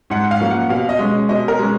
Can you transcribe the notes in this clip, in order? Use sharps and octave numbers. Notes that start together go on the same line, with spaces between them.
G#2 F#5
F5
F3 A#3 C#4
F#5
B2 F5
D#5
G#3 C#4
B2 D#5
A#4
G#3 C#4